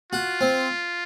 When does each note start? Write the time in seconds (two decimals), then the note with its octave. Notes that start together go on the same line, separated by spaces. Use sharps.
0.12 F4 F#4
0.41 C4